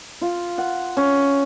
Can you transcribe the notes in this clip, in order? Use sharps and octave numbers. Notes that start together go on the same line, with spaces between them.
F4
F#5
C#4